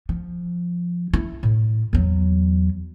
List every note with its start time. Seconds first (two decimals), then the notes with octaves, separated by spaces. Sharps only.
0.09 F3
1.13 E4
1.43 A2
1.93 E2 F#3